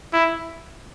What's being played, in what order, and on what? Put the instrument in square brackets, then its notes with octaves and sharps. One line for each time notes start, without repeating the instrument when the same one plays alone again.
[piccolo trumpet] E4